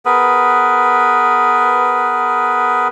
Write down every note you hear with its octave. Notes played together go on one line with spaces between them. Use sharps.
B3 G#4 A#4 B4